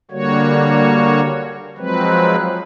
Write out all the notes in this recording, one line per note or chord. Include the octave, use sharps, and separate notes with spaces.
D3 G3 A#3 F#4 C#5
F3 F#3 G#3 C4 B4